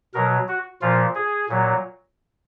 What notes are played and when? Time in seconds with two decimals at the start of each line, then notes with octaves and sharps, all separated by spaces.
0.14 B2 F#3 A#4
0.48 F#4
0.82 A#2 F3 F4
1.15 G#4
1.49 A#2 F#3